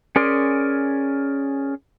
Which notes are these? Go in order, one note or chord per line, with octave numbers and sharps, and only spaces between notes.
C#4 G#4 A#4 D5 C6